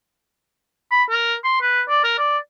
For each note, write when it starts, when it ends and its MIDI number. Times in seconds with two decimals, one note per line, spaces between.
0.91 1.04 83
1.10 1.35 70
1.44 1.60 84
1.62 1.82 71
1.89 2.03 74
2.04 2.17 70
2.18 2.38 74